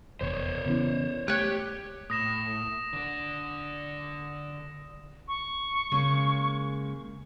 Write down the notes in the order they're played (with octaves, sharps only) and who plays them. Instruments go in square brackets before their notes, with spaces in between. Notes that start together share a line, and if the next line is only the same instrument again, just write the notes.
[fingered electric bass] F1 E2 B2 [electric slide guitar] C5 C#5
[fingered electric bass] C#3 E3 [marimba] B3 C#4 E4
[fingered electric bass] G#3 A3 [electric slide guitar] G4 [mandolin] C#5 F#6
[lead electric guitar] A2 [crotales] D#6 A#6 E7
[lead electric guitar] D3 D4
[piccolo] C#6
[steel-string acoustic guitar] C#3 G#3 A#3